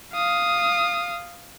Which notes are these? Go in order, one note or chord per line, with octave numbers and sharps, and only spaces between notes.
F5 D#6